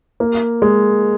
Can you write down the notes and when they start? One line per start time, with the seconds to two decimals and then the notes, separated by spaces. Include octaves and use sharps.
0.20 A#3
0.62 G#3